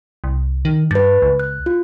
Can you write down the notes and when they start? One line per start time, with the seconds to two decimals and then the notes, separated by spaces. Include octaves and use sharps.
0.24 C2
0.65 D#3
0.91 G2 B4 A6
1.22 C#2
1.40 F#6
1.66 F4